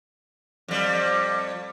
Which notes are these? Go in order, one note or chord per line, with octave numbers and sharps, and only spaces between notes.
F2 G3